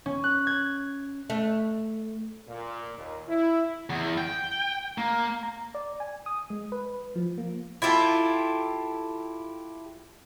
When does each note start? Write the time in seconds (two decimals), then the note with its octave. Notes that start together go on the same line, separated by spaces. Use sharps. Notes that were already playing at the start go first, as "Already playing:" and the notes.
0.06 C#4
0.24 F#6
0.47 G#6
1.30 A3
2.47 A#2
2.97 D#2
3.28 E4
3.90 E2
4.18 G5
4.98 A#3
5.43 A#5
5.75 D5
6.00 G#5
6.26 D#6
6.50 G#3
6.72 B4
7.15 F3
7.38 A#3
7.82 E4 F4 G4 A4